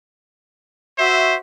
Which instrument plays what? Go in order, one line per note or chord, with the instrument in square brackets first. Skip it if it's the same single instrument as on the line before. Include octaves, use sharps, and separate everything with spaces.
[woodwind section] F#4 E5 [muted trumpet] C5